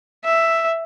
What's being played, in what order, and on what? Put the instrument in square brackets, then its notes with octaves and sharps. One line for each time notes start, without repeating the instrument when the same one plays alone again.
[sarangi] E5